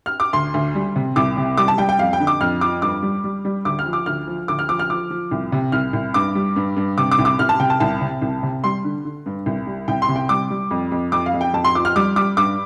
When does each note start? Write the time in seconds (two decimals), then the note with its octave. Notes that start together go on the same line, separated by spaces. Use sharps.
0.06 F6
0.20 D6
0.33 D2 C6
0.54 D2
0.75 G3
0.96 C3
1.16 C2 D6
1.37 C3
1.57 G3 D6
1.68 A5
1.78 G3 G5
1.89 G5
1.99 F2 F5
2.13 G5
2.20 D3
2.27 D6
2.41 F2 F6
2.61 F3 D6
2.82 G2 D6
3.03 G3
3.24 G3
3.45 G3
3.65 D2 D6
3.79 F6
3.86 F3
3.93 D6
4.06 D2 F6
4.28 F3
4.48 D2 D6
4.59 F6
4.69 F3 D6
4.79 F6
4.90 F3 D6
5.11 F3
5.31 C2
5.52 C3
5.72 C2 F6
5.93 C2
6.14 G2 D6
6.35 G3
6.56 G2
6.77 G2
6.98 C3 D6
7.11 D6
7.19 C2
7.25 D6
7.39 C2 F6
7.49 A5
7.59 C3 G5
7.70 A5
7.80 C2 A5
8.01 C3
8.22 C2
8.43 C3
8.64 G3 C6
8.84 D3
9.05 D3
9.26 G2
9.46 C2
9.67 G3
9.88 C2 G5
10.02 C6
10.08 C3
10.16 G5
10.29 G3 D6
10.50 G3
10.71 F2
10.92 F2
11.12 F2 D6
11.26 F5
11.34 F2
11.41 G5
11.54 F2 A5
11.64 C6
11.75 F3 D6
11.85 F6
11.96 G3 D6
12.16 G3 D6
12.37 G2 D6